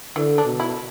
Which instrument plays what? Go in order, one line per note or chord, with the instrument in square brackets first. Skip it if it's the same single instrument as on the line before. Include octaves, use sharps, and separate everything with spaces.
[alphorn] D3 [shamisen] E3
[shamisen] D4
[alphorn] B2
[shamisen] E4